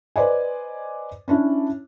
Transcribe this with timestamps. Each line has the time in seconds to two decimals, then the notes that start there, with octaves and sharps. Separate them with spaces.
0.16 B4 C5 D5 D#5 G#5
1.28 C#4 D4 E4